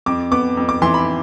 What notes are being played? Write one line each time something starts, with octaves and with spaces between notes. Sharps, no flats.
F2 D6
B3 D6
F2
D6
E3 C6
B5